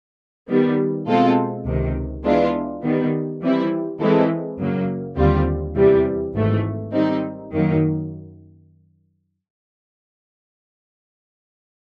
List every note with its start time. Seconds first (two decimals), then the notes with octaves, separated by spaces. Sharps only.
0.49 D#3 G3 B3
1.07 B2 G#3 C4 F4 A4
1.66 C#2 C3 D#3
2.25 E3 G#3 B3 D4 F4
2.83 D#3 G3 B3
3.42 E3 G3 C4 E4
4.00 E3 G#3 C4 E4 A4
4.58 F#2 C#3 F#3 A#3
5.17 D#2 D3 G3 C4 F4
5.76 E2 C3 E3 G3
6.34 G#1 G#2 E3 A3
6.93 D#3 G3 C4 D#4
7.52 F#2 D#3 F#3 A#3